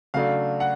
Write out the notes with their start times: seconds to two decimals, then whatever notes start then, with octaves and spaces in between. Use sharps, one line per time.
0.14 C#3 F#3 A3 D4 F5
0.60 F#5